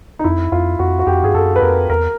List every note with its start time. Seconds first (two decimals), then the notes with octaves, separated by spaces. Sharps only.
0.19 D#4
0.24 F2 E4
0.52 F2 F4
0.79 F2 F#4
0.99 F#4
1.07 F2 G4
1.23 G2 G#4
1.34 F#2 A4
1.56 B4
1.62 F2 A#4
1.89 E2 A#4